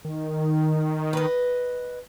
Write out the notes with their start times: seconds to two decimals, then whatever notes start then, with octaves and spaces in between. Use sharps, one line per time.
0.04 D#3
1.13 B4 D#5